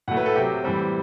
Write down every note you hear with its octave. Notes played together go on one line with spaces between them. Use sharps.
A2 F#3 A3 F#5
B4
A4
C3 F#3 C4 G4
A2 E3 G3 C4